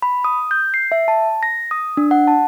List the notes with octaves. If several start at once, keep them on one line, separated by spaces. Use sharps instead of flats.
B5
D#6
G6
C7
E5
A5
A#6
D#6
D4
F#5
A5